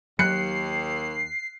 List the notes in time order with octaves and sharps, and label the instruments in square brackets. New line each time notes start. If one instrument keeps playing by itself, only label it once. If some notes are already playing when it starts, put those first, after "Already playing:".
[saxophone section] D#2 [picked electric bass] F#3 [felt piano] F#6 C#7 [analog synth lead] C7